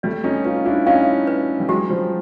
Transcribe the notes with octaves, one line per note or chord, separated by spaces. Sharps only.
G3 A3 D5
C#4 D#4
D#4 F4 B4
D4 E4
C#4 D#4 F5
B4
G3
F#3 G#3 G4
F3 G3